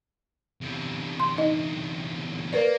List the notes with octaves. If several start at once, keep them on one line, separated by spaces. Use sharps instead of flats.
E2 C3
C6
D#4 D#5
A#3 A#4 B4 D5